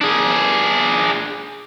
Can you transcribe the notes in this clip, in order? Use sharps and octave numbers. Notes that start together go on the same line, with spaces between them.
D4 G#4